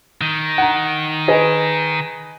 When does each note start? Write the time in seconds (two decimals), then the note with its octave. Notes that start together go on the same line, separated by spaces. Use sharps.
0.21 D#3
0.58 F#5 A#5
1.28 G#4 B4 D#5